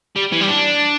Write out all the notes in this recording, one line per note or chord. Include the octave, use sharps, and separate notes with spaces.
G3
E3
G3
D4